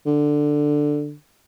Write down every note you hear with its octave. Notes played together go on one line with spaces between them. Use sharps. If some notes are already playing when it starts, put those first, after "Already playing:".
D3